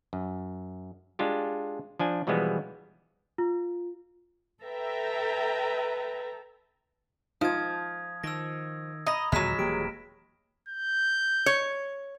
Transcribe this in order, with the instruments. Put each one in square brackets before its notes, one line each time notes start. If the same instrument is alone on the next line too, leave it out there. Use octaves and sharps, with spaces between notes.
[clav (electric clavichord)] F#2
G#3 D4 F4 G4
F3 D4 G#5
B2 E3 F3 G3 G#3 B3
[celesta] F4
[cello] A4 [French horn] B4 [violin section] E5 G5 A#5
[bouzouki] F3 [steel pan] D#4 F4 C5 [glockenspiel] D#6 G#6
[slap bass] D#3 [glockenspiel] E6 A#6
[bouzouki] D#5 [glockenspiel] A#5 B5 A#6
[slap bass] D#2 A#2 D3 [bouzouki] F#3 G#3 [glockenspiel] F6 B6 E7
[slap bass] D#1 E3 A#3 [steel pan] G4 [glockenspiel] D7
[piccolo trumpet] G6
[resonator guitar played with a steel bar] C#5